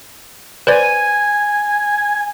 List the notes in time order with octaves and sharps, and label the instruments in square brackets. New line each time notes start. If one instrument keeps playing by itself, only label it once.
[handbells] B4 C5 D5 [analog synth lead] G#5